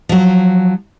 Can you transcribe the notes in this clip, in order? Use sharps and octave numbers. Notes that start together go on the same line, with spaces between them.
F3 F#3